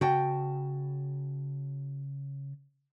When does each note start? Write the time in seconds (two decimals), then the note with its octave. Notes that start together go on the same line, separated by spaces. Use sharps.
0.01 C#3 F#4 G5 A5